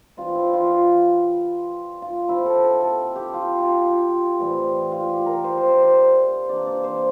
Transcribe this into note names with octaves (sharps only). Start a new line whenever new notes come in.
E3 G3 C4 F4
E4
F4
F4
F4
C3 F3 C4 E4
A4
A4
A4
G4
F4
F4
F4
A2 E3 G3 C4
F4
G4
A#4
C5
C5
D5
C5
C3 E3 A#3 D4 D5
D5
C5